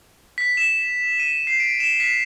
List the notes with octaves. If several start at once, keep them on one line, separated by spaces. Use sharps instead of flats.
B6
E7
D#7
C7
D7
E7
B6